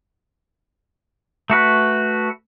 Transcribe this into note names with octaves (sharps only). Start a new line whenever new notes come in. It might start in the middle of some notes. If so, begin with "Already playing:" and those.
A3 F#4 B4